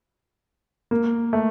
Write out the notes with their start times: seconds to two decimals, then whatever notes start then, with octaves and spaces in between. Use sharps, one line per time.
0.91 A#3
1.33 A3